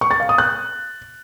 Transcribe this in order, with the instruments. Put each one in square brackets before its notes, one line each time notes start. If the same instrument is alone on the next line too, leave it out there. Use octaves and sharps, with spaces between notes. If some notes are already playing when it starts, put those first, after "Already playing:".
[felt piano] C#6
A6
F5
D#6
F#6